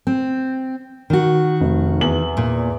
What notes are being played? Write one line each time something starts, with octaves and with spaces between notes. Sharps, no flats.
C4
D#3 F#4
F1
E2 F#7
A#2